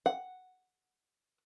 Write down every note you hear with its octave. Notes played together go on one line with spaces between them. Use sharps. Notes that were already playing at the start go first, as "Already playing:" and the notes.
F#5